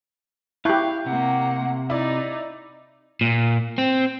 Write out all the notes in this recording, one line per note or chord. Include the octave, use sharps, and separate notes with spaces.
E4 G4 F5 C#6 F#6 G6
C3 A#3 F#5
D#4 E4 D5
A#2
C4